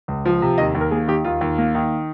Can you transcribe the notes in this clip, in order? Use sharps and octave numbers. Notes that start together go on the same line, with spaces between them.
C#2
F3
C3
D#2 D#5
D#2
A#4
A#3 G#4
D#3 G4
D#2 F4
D#2
A#3
D#3